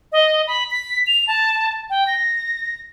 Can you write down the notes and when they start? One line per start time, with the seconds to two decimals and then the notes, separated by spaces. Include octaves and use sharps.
0.12 D#5
0.47 B5
0.71 B6
1.07 F7
1.28 A5
1.90 G5
2.07 A#6